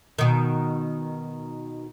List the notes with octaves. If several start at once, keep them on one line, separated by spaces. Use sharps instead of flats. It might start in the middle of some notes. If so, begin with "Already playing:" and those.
B2 D#3